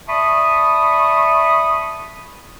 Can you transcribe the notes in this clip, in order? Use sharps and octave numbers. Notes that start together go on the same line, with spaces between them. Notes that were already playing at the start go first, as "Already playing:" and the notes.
D5 E5 A5 B5 C#6 D#6